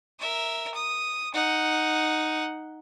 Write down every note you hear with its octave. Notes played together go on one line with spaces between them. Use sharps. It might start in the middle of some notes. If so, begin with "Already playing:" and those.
A#4 E5
D#6
D#4 F#5